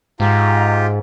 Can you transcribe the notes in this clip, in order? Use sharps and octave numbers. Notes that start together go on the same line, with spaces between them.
G#2 F4 G4 A#5